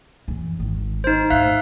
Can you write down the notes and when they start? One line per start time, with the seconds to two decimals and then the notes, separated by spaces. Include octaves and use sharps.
0.28 F#2 E3
0.59 G#1 D#3
1.04 D#4 C5
1.30 G#2 A3 E5 F5 F#6